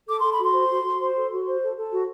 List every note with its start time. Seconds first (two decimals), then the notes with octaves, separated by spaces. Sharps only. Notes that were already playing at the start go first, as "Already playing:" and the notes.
0.08 A4 D6
0.20 A4 C6
0.32 B5
0.39 F#4 C6
0.53 C5
0.70 F#4
0.84 F#4
1.00 C5
1.15 A4
1.31 F#4
1.46 C5
1.61 A4
1.76 A4
1.91 F#4